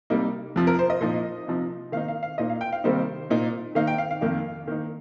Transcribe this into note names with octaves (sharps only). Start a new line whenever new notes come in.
C3 G3 A#3 D#4
F2 C3 F3
A#4
C5
D#5
A#2 F3 D#4
C3 F3 D#4
D#3 A#3 D#4 F5
F5
F5
A#2 A#3 D#4 D#5
F5
G5
F5
C3 D#3 G3 A#3 D#4 C5
A#2 A#3 D#4
D#3 A#3 D#4 F5
G5
F5
F5
F2 D#3 A#3 D#4
D#3 A#3 D#4